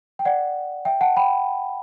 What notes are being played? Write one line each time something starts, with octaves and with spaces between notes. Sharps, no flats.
G5
D5 F#5
E5 G5
F#5 A5
G5 B5